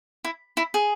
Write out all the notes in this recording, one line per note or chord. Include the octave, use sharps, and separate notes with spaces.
E4
E4
G#4